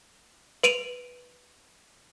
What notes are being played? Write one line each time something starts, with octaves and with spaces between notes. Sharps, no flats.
B4 D7 D#7 F7